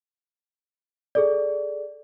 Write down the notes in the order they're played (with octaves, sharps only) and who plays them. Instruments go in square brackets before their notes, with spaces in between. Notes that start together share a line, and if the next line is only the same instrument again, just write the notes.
[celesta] G#4 A4 D5